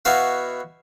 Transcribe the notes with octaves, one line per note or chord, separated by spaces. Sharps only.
B2 E4 F#4 F5